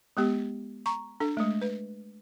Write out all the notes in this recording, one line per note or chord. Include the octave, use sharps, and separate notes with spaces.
G#3 B3 G4
A#5 C#6
D4 A4
G#3 A3
B4